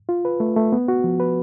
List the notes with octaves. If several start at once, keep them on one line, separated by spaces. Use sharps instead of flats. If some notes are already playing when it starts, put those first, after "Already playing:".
F4
B4
A3
A3
B3
F#4
F3
B4